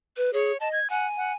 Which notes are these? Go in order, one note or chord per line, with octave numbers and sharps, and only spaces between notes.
B4
G#4 C#5
D#5 A5
G#6
F#5 G#5
F#5